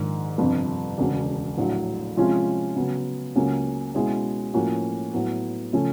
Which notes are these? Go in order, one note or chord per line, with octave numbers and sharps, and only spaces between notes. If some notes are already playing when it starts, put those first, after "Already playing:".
Already playing: A#1 G#2 D#3
G1 F2 C3
E1 D2 C#3
A#1 A2 F#3
C3 F3 G#3 C#4 F4
C#3 F#3 B3
C#2 C#3 F#3 A#3 C#4
B2 G#3 C#4 E4 G#4
A2 F3 A#3 C#4 F#4
A2 F#3 B3
C#3 F3 A3 C#4